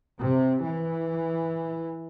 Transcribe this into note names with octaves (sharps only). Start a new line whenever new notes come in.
C3
E3